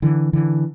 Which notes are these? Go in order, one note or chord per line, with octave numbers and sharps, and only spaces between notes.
D3 E3
D3 E3